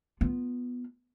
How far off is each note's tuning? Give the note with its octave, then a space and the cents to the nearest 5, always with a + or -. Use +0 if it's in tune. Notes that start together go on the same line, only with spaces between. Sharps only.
B3 -5 F4 -5